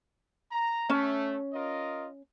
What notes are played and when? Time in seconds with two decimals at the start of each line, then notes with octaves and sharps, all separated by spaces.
0.52 A#5
0.90 A3 C#4
1.54 F4 A#4 D#5